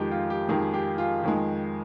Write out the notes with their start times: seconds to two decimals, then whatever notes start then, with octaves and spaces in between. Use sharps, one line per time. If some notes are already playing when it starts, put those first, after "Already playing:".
Already playing: F2 D#3 G#3 G4
0.12 F4
0.30 G4
0.49 F2 D#3 G#3 G#4
0.74 G4
0.98 F4
1.24 F2 D#3 G#3